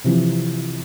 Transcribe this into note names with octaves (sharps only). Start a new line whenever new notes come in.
C3 E3 F3